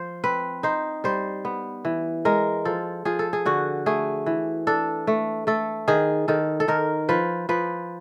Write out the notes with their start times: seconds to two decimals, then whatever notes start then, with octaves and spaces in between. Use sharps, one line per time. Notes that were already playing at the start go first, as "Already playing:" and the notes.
Already playing: F3 C5
0.24 C4 B4
0.63 D#4 C5
1.04 G3 C5
1.45 B3
1.85 E3
2.25 G#3 A#4
2.65 F3 A4
3.05 F3 G#4
3.19 A4
3.33 G#4
3.46 D3 F#4
3.86 A3 G#4
4.26 E3
4.67 D4 A4
5.07 A3
5.47 A3 A4
5.88 D#3 G#4
6.28 D#3 A4
6.60 A4
6.68 D#3 A#4
7.09 F3 B4
7.49 F3 B4